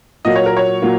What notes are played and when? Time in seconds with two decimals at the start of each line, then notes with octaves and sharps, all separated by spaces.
0.25 A#2 F#3 A#3 D#5
0.36 C#5
0.46 A#4
0.57 C#5
0.82 A#2 F#3 A#3